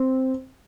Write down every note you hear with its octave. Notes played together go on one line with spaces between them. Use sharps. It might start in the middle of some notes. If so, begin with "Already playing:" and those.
Already playing: C4